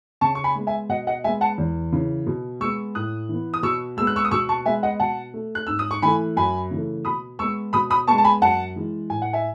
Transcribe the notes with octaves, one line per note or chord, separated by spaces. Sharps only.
C#3 A5 C#6
C#6
G#5 B5
G#3 B3
E5 G#5
B2 D#5 F#5
D#5 F#5
G#3 B3 E5 G#5
F#5 A5
E2
C#3 E3
B2
G#3 B3 C#6 E6
A2 D#6 F#6
E3 B3
D#6
B2 C#6 E6
G#3 B3 E6
F#6
C#6 E6
D#6
B2 C#6 E6
A5 C#6
G#3 B3 E5 G#5
D#5 F#5
B2 F#5 A5
A3
F#6
G#2 E6
D#6
C#6
E3 A3 G#5 B5
F#2 G#5 B5
C#3 E3 A3
B2 B5 D#6
G#3 B3 C#6 E6
B2 B5 D#6
B5 D#6
G#3 B3 A5 C#6
A5
G#5 B5
F#2 F#5 A5
E3 G#3
A2 G#5
F#5
E5 G#5